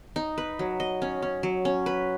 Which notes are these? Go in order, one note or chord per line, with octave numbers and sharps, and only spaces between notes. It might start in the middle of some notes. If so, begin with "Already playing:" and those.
D#4
B4
F#3
D#5
C#4
C#4
F#3
C#4
B4